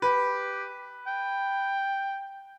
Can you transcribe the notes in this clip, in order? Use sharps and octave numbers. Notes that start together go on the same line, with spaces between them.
G4 B4
G5